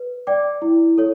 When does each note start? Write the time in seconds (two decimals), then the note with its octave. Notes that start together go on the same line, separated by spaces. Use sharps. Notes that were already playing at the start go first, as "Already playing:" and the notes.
Already playing: B4
0.27 D5 G5 D6
0.62 E4
0.98 A4 C#5